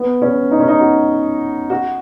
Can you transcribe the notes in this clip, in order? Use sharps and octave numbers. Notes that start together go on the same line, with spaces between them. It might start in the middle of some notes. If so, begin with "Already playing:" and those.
Already playing: B3
C#4
D#4
C#4
D#4
F#4
F#4